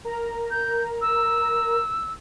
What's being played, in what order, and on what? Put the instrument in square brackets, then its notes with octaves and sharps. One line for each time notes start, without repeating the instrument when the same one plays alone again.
[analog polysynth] A#4 A#5
[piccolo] G6
E6